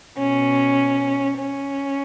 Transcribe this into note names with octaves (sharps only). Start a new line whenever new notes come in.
B2 C#4
C#4